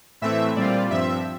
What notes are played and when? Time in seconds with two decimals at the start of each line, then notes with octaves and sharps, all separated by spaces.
0.21 A2 E3 A3 C4 E5
0.56 A#2 G3 C4 F4 D5
0.91 G2 F3 C4 E5